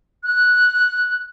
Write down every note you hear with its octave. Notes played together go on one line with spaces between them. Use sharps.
F#6